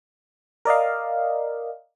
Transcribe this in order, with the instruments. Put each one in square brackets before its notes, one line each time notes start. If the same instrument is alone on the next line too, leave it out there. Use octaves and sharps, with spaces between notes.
[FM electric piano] A#4 D5 D#5 F5